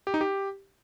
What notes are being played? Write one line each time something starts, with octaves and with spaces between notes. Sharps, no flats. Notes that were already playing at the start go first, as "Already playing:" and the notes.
G4
D#4
G4